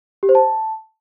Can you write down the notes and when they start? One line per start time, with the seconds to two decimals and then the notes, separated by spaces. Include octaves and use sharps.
0.23 G4
0.29 C5
0.35 A5